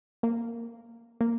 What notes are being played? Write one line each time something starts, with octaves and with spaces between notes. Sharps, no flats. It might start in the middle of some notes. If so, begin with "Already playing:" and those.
A#3
A#3